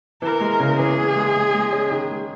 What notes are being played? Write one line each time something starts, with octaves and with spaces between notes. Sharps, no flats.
E3 A#4
G#3
C#3
E3 G#4
E3
G#3
G#3
G#3
C#4
D#3
G#3